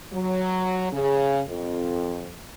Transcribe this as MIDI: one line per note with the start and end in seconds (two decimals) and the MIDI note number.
0.12 0.87 54
0.92 1.41 49
1.48 2.33 41